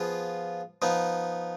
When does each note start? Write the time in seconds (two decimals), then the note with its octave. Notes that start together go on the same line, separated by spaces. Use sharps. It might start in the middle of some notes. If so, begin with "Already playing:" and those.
Already playing: F3 B3 F4 G#4
0.82 F3 B3 D#4